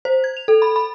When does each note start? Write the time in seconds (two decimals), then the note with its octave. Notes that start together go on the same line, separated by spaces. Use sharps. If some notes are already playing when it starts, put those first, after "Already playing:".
0.05 C5
0.24 G#6
0.37 F7
0.48 A4
0.62 B5
0.76 B5